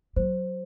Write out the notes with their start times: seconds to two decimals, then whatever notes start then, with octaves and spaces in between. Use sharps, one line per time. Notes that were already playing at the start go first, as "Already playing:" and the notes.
0.16 F#3 C5